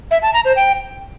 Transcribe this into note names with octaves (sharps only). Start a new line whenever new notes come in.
E5
A5
A#5
C5
G5